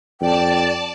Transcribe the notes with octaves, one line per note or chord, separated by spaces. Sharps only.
F2 D5 G5 A5